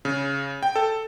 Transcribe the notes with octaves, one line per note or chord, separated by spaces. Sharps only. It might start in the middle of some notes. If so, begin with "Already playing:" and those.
C#3
G5
A4